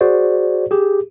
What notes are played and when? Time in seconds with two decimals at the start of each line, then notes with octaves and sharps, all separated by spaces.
0.01 F#4 G#4 C5 D5
0.71 G4 G#4